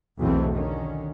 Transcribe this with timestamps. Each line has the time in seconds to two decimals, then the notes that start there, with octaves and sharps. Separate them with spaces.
0.20 B1 E2 B2 E3 A3 C4
0.51 D3 D#3 C#4